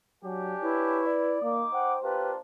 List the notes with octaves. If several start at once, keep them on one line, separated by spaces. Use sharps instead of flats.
F#3 D4 G4 G#5
E4 B4 C#5
D5
A#3 D#4 D6
C5 F#5 G5
A#3 D4 F4 G4 B4